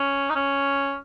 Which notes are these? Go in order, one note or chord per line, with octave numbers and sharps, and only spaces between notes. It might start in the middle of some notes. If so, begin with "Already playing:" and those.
Already playing: C#4
D#4
C#4